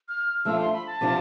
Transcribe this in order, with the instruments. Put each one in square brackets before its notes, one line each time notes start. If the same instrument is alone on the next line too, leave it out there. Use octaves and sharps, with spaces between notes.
[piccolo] F6
F6
[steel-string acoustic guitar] F3 A3 D4 F4 [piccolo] E6
[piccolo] C6
B5
A5
[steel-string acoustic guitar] C3 F3 B3 D4 F4